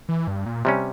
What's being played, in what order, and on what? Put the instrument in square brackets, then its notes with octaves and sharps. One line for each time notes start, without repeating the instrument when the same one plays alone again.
[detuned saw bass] E3
G2
A#2
[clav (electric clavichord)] C3 G3 C#4